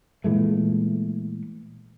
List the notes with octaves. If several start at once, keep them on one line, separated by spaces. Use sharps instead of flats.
A#2 E3 G#3 A3